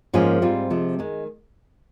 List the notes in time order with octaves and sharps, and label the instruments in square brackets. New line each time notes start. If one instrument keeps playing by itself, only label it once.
[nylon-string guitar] G#2 F3 A#3 C#4 G#4
G#2 G3 C4 F4
C3 F3 G#3
D#3 G#3